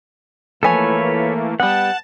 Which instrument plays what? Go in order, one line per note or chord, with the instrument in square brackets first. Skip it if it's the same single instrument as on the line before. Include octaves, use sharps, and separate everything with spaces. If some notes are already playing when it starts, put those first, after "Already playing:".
[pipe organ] E3 A3 A#3 [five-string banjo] F3 G#5 [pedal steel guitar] A4 B4 C#5
[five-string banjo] G3 B3 [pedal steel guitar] F#5 [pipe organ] A5